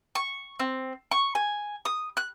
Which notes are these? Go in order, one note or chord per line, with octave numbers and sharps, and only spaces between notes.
C#6
C4
C#6
G#5
D#6
F#6